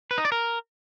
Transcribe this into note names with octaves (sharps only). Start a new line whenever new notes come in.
B4
D#4
D5
A#4